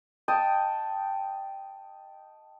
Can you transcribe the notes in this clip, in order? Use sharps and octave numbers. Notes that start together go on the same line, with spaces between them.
D#5 G5 A5 D#6